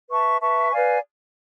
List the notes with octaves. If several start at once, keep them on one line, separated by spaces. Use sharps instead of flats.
B4 E5 A5 C#6
B4 E5 A5 C#6
B4 D5 F5 G#5